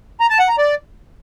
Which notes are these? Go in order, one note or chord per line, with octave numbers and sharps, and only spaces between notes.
A#5
A5
F#5
A#5
D5